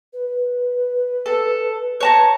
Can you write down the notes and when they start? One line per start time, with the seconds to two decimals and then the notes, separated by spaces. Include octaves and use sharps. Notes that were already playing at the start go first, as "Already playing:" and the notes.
0.13 B4
1.26 A4
2.00 C#5 A5 A#5